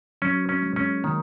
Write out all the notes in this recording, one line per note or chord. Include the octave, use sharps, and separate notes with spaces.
F#3 C#4
C#4
G#3
C#4
D#3 A#3